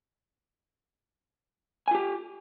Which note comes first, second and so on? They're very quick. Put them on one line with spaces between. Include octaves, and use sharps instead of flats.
G#5 F4 G4